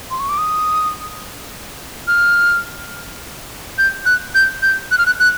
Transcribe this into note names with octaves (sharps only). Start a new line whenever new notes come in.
C6
C#6
D6
D#6
F6
G6
F#6
G6
G6
F#6
F6
F#6
F#6